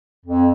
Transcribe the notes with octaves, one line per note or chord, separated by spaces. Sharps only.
F2